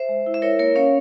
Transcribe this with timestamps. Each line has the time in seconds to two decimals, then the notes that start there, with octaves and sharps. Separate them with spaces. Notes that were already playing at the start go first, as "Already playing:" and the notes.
Already playing: C5 E5
0.09 G#3
0.26 E4
0.34 E5
0.42 E4 A#4 C#5
0.59 A#3 A#4 C#5
0.75 C#4 C#5 F5